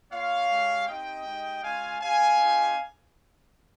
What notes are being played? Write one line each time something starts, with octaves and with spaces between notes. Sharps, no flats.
A#3 F4 C#5 F5
G#3 C#4 G4
C4 D#4 G4 D#5 G5
G#3 D#4 G4
G#3 C#4 F4 F5 G#5
C4 G4 F5 G#5
C4 D#4 G4